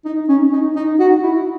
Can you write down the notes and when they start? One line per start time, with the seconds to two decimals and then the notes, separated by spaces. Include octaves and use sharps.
0.05 D#4
0.29 C#4
0.52 D#4
0.75 D#4
0.99 F#4
1.23 E4